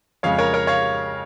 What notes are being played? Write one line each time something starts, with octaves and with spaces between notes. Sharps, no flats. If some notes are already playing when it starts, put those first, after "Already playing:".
F2 C#3 G#3 C#5 F5
A#4 C#5
A#4 C#5
C#5 F5